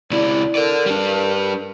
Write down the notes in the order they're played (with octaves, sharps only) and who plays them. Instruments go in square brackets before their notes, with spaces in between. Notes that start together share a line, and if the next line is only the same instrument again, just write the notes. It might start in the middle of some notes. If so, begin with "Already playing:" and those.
[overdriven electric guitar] C#2 E4 [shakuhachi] D5
[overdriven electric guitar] A4 D5 [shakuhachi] A#4
[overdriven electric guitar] G3 D4